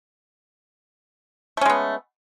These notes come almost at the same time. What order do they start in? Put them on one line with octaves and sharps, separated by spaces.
A3 C#4 G#3 B3